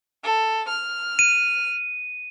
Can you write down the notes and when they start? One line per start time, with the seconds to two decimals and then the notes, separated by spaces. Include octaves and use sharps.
0.24 A4
0.69 F6
1.19 D#7